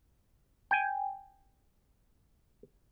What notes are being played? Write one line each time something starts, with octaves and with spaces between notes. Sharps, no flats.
G5 G#5